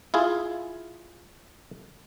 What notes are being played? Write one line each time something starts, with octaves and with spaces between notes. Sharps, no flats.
E4 F4 G#4